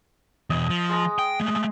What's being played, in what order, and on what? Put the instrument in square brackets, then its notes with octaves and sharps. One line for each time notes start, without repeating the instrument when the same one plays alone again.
[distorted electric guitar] E2 B2 [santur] D#5
[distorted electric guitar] F3
[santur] G#3 A#5
[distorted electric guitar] G5
G#3 A3